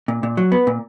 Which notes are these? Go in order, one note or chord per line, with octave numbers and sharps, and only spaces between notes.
A#2
A#2
F#3
B3
A#2